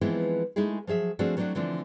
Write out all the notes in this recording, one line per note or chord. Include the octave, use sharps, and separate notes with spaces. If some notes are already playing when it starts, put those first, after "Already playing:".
E3 F3 G#3 B3 C4 E4
G#3 A3 D#4 E4 G#4
F3 F#3 G#4 E5
F3 A3 C4 D4 F#4 G#4
F#3 A3 C4 D4 E4 F#4
D3 E3 F3 A3 C4 D4